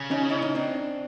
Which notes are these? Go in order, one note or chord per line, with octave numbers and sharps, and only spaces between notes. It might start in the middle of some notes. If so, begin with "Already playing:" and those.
Already playing: C#3
C#4 D#4
D4 E4
C#4 D#4
C4 D4